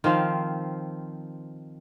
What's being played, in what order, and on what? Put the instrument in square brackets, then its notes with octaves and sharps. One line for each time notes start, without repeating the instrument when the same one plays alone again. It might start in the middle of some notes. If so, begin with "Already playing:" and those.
[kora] D#3 F3 C4 F5